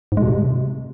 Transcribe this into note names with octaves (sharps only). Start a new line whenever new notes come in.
G#2
G#3
B2
C3